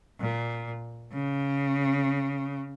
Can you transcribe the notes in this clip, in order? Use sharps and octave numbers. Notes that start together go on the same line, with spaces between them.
A#2
C#3